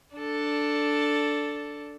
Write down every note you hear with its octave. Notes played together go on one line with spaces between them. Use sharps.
D4 A4